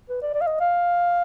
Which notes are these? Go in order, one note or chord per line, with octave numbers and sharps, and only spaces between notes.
B4
D5
D5
F5
D#5
F5